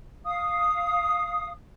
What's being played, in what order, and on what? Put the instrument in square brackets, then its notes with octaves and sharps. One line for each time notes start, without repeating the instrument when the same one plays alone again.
[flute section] F5 D#6